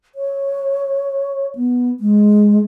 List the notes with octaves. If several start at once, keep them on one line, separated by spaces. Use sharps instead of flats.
C#5
B3
G#3